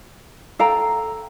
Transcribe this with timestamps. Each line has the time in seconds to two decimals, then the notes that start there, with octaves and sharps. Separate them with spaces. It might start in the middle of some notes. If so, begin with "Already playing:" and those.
0.59 A4 F5 G5 A#5